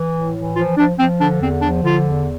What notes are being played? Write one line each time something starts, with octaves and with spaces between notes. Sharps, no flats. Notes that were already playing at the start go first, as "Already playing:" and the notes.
Already playing: E3
A2
E3
F3 F4
F3 D4
F3 C4
D3 D4
E2 C4
F3 D4
D3 F4
E2